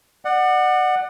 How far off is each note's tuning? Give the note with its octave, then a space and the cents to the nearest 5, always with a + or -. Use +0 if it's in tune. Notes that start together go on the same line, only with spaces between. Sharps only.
D5 +40 F#5 +0